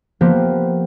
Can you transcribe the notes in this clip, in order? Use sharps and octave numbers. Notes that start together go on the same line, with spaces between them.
F3 A#3 B3 G4